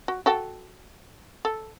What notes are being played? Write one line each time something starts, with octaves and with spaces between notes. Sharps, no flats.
F#4
F#4 A4 G5
A4